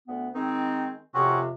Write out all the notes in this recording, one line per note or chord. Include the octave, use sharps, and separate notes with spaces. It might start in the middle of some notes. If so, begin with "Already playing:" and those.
D2 B3
D#3 G#3 C4 D#4
F2 C3 C4 C#4 F#4